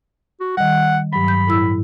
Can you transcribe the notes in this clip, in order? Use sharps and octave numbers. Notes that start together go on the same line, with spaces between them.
F#4
D#3 G3 F#5
G2 F#3 B5
G6
A2 E4 E6